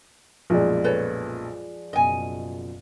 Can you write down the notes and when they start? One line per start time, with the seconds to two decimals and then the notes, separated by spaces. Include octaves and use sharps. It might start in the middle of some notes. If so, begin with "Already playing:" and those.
0.50 B1 F#2 A#2 F3 G#3 D5
0.84 A4 B4 C#5
1.93 F#1 B2 D#5 G#5